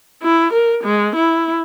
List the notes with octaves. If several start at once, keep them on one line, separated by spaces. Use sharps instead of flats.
E4
A#4
G#3
E4